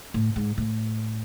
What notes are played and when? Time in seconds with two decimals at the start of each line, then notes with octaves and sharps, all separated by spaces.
0.14 A2
0.36 G#2
0.58 A2